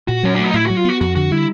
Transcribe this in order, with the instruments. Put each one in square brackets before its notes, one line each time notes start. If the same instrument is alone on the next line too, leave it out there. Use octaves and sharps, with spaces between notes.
[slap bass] A#2 [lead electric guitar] F#4
[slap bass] F#3 [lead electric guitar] C#4
[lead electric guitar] D4
[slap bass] A3 [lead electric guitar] D#4
[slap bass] A2 [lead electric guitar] E4
[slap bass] F#3 [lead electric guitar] F#4
[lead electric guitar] F4
[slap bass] B3 [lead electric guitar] F#4
[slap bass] F2 [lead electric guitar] F#4
[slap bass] D3 [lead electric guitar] F#4
[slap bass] G3 [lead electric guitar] E4